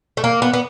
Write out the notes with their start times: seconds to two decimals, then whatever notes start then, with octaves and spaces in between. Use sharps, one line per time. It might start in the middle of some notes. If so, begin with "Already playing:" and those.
0.17 A3
0.24 A#3
0.42 B3
0.53 B3